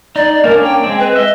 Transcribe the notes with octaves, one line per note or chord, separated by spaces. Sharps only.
D#4 D5
A#3 C#4 D4 A#4
G5
G#3 C4
B4
D#5 E5